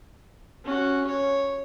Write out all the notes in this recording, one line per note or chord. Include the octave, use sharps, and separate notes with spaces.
C#4 F#4
C#5